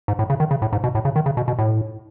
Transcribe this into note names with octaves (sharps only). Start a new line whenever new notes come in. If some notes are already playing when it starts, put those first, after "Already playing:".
G#2
A2
C#3
D#3
C#3
A2
G#2
B2
A2
C#3
D#3
C#3
B2
B2
A2